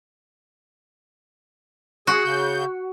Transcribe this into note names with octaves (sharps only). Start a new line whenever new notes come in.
F#4 G#4
C#3 G6